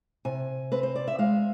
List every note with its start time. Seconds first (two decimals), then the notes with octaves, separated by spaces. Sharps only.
0.25 C3 G#5
0.72 C4 B4
0.83 C5
0.96 D5
1.08 E5
1.19 G#3 F5